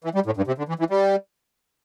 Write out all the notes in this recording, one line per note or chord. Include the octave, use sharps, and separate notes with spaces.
E3
G3
A2
G2
C3
D3
E3
E3
G3